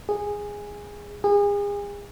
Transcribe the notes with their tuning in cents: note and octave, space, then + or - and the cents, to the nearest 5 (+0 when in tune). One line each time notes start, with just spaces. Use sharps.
G#4 -10
G#4 -35